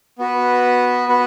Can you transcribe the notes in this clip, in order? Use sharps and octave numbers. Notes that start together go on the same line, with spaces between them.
B3 F#4 B4
B3 F#4 B4